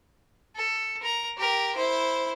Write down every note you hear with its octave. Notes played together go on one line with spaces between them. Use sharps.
A4
A#4 A#5
G4 A#4
E4 C5